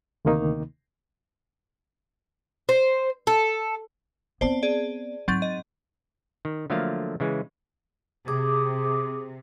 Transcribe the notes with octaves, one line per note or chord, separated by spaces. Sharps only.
D2 C3 D#3 A#3 D#4
C5
A4
B3 C4 C5 D5 A5
G#4 D5
G#2 F#3 C4 A6
D#5
D#3
D3 F3 F#3 A3 A#3 F5
C#3 E3 G#3
C3 G#4 D6 D#6